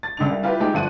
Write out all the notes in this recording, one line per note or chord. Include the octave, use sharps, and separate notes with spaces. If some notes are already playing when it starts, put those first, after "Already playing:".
A6
C#2 D4 F7
C2
E4 F4 G4 B4
G#3 D#4 G4
G1 F3 F#5 D#7